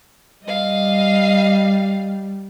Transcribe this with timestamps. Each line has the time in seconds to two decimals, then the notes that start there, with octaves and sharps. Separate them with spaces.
0.44 G3 D#5 F5